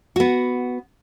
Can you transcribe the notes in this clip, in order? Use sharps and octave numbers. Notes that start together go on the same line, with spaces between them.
B3 F#4